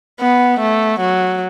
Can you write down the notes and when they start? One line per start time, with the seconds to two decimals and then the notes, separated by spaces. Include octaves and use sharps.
0.21 B3
0.60 A3
1.00 F#3